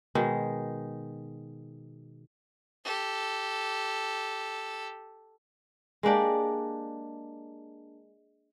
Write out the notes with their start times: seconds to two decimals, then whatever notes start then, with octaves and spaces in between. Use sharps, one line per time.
0.15 B2 D#3 G#3
2.85 G4 A4
6.03 G#3 A#3 D4 G4